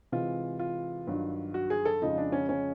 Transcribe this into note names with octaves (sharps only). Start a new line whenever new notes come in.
C3 E3 G#3 F4
F4
G2 D#3 F#3
F#4
G#4
A4
F2 C#3 F3 G#3 D#4
D4
C#4
C#4